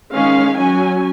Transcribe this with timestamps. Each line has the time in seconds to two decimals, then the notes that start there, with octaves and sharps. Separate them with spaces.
0.13 D#3 G#3 C#4 F5
0.58 F#3 C#4 G#5